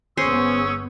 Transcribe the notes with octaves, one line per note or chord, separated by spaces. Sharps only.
G1 B3 C#4 G#4 C5 C#6 E6